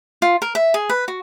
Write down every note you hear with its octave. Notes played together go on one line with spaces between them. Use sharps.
F4
A#4
E5
G#4
B4
F#4